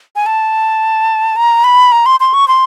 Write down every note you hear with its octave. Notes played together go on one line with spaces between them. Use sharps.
G#5
A5
A#5
B5
A#5
C6
C6
C#6
C6